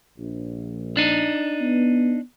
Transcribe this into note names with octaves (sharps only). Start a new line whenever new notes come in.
A#1
D4 D#4
B3